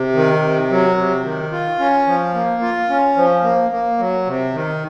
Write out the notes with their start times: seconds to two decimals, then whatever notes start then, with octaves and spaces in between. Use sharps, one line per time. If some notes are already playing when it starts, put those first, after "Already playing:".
Already playing: C3
0.15 D#3
0.42 C3
0.70 F#3
0.97 C3
1.24 D#3
1.52 F4
1.79 C#4
2.07 F3
2.34 A#3
2.62 F4
2.90 C#4
3.17 F3
3.44 A#3
3.71 A#3
3.98 F#3
4.26 C3
4.54 D#3